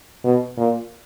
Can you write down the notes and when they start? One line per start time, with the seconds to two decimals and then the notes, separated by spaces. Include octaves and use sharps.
0.24 B2
0.57 A#2